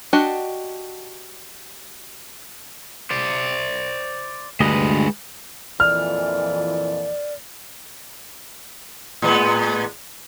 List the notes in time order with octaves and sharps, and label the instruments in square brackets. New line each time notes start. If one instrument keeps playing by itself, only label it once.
[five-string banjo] D4 F#4 G4 D#5 F#5
[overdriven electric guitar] C5 D5
[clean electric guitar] D2 G2 D#5 [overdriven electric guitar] G#3 B4
[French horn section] F2 A#2 E3 [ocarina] D5 [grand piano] F6
[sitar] A2 G#3 B3